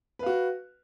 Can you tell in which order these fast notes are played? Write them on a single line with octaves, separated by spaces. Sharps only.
B4 F5 F#4